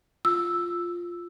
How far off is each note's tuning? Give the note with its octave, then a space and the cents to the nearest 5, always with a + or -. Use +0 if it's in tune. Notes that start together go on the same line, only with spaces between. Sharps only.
F4 +0 E6 +0